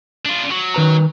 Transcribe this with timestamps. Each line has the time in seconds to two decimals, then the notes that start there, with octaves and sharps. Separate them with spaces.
0.25 D4 F4
0.51 F#3
0.74 D#3 B4 A#5